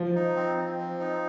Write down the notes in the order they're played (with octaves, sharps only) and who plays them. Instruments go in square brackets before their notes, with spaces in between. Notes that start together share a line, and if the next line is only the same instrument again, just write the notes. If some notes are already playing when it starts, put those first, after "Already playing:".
Already playing: [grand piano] F3
[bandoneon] D#4
C4
C4
F3
D#4